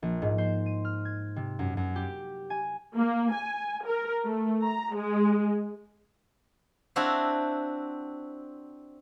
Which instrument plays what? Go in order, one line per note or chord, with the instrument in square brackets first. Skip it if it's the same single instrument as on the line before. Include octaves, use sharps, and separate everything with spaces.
[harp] A#1
G#2
C5
D#7
F6
G#6
C3
F#2
F#2
G4
G#5
[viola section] A#3
G#5
A#4
A3
A#5
G#3
[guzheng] C4 D4 E4 F#4 F5